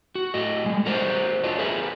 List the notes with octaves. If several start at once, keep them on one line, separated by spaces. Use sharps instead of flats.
F#4
A2 A3 D#5
G3 G#3
F#4 A#4 C5 D5
D4 F4 C#5 D#5
G#4 A#4 B4 E5